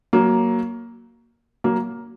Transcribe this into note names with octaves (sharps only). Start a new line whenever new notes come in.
F#3 A#3
F#3 A#3